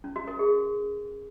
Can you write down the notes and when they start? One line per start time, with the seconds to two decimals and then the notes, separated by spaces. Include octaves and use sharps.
0.04 C#4
0.16 F#4
0.27 A#4
0.39 G#4